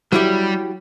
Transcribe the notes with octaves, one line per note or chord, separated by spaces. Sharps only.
F#3 G3 E4 G4